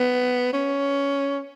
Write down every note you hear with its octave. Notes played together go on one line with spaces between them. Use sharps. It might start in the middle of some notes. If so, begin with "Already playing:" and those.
Already playing: B3
C#4